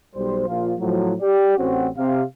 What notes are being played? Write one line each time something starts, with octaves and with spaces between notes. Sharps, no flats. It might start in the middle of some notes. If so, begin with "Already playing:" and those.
B1 G3 C5
A#1 F3 F4
A2 F3 F#3
G4 D5
A1 C4 C#4 F#4
C3 F5